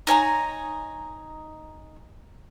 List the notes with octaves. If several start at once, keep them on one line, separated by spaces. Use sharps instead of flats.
D#4 C#5 G#5 A#5